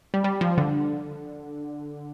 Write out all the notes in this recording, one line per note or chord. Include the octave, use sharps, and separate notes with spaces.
G3
G3
F3
D3